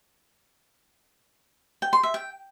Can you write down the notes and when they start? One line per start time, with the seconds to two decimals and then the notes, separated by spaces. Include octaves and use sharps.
1.82 G5
1.93 C6
2.03 E5
2.14 G5